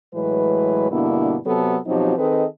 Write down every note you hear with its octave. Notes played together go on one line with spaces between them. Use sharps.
A2 E3 F#3 G#3 B4
G2 B2 D3 A#3 B3 E4
C3 F#3 B3 A4
B2 F3 F#3 C4 D#4 G4
D#3 C4 G#4 A4 B4 D#5